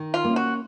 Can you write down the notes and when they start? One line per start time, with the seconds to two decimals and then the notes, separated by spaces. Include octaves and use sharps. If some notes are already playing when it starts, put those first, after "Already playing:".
Already playing: D#3
0.14 F4
0.25 A#3 C#4
0.36 F#4